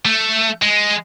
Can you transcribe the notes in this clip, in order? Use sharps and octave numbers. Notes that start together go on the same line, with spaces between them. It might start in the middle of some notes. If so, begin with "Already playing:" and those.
A3
G#3